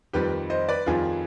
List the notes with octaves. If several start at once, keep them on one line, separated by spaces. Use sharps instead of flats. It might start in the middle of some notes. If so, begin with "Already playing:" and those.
F2 D#3 G3 G4 B4
C5 D#5
B4 D5
F2 D#3 G3 F4 G#4